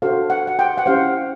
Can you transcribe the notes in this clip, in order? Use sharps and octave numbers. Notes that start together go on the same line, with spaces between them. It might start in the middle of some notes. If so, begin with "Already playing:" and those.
D4 F#4 A4 C5 F5
F#5
F#5
G5
F#5
C#4 E4 G4 C5 F5